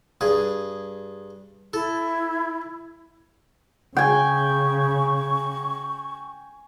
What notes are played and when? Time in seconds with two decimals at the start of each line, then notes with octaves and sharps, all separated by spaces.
0.21 G2 G#4
1.73 E4 A4
3.97 C#3 G5 G#5 C#6